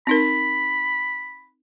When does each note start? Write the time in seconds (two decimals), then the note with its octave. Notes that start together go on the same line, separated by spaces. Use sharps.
0.07 C4 D#4 A#4 B5